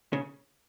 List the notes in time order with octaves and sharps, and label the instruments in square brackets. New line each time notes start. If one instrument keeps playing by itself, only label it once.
[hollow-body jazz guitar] C#3